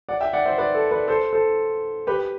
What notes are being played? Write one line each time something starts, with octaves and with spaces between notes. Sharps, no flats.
D5 F#5
E5 G5
D5 F#5
C5 E5
B4 D5
A4
B4 D5
A4 C5
A4 C5
G4 B4